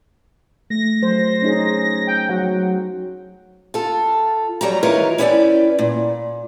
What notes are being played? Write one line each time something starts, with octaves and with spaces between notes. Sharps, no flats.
A3 A#6
F#3 C5
C#4 D#4 G#4
G5
F#3 F#5
F4 A4
G2 F#3 G3 F#4 G5 A#5
D#3 E3 F4 A#4 B4 C#5
C#4 E4 B4 C#5 D5 G5
A#2